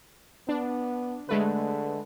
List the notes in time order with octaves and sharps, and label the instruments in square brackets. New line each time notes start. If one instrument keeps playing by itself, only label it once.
[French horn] B3 [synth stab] D4
[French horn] D3 [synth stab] G#3 A3 B4